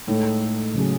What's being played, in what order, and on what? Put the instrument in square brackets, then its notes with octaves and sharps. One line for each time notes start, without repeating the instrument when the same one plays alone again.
[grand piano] A2 [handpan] G#3 D#4 A4
[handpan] C#3 F#3 C#4 G#4